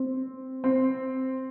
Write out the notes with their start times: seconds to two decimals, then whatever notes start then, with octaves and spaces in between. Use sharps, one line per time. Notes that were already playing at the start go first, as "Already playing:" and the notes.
Already playing: C4
0.64 C4